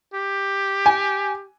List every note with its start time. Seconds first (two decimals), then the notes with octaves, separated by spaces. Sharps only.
0.14 G4
0.86 G#5